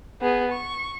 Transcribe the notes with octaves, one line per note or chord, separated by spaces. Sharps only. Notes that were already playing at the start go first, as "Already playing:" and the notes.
B3 G#4
C#6